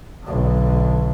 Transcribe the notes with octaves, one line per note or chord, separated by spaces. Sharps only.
B1 D3